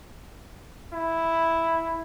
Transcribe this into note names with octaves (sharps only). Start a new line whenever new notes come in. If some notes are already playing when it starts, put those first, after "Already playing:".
E4